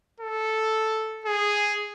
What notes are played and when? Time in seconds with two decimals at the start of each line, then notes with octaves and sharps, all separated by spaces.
0.20 A4
1.26 G#4